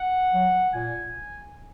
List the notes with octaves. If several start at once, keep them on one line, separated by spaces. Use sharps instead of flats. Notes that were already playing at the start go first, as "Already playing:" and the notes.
Already playing: F#5
F#3
A#2 G#5